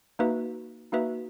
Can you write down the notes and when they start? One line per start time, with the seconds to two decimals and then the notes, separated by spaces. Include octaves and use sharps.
0.19 A#3 D#4 F#4 B4 E5
0.92 A#3 D#4 F#4 B4 E5